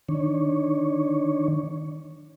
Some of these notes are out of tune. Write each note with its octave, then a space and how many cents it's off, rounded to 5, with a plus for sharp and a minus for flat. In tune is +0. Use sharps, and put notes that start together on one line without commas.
D#3 +0 D4 +0 C#5 +0